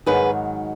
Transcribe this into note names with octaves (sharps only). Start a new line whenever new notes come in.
G#2 D#3 F#3 G#4 B4